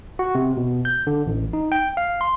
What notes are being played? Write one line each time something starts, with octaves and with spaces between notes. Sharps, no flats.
F#4
C3
B2
G6
D3
A1
D#4
G5
F5
C6